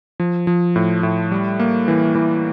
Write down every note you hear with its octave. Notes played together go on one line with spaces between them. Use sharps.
F3
F3
A2
A2
G3
A#3
E3
E3